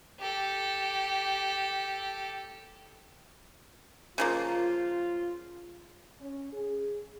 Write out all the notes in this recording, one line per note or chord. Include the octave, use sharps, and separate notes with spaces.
G4 A4
C#3 F3 A#3 F4
C#4
G#4